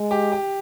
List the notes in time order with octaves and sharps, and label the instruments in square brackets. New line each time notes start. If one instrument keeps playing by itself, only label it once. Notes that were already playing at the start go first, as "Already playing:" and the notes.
Already playing: [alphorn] G#3
[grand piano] G4
G4